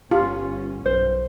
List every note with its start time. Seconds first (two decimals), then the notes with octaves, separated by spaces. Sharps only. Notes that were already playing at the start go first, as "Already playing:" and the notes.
0.11 G1 C#4 F4 G4
0.86 B1 C5